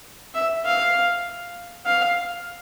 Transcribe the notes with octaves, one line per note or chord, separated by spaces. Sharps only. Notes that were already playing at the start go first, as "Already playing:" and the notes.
E5
F5
F5